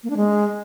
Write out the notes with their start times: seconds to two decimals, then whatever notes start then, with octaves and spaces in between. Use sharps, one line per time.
0.04 A#3
0.10 D4
0.17 G#3